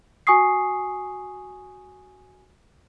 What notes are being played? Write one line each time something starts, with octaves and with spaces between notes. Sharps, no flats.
F#4 G#5 C#6 D#6 C7